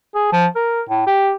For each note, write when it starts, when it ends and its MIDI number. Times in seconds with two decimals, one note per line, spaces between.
0.15 0.30 68
0.32 0.46 53
0.55 0.81 70
0.89 1.02 45
1.07 1.32 67